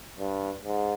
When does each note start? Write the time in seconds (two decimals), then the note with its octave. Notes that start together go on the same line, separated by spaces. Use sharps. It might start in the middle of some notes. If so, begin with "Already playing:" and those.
0.19 G2
0.64 G#2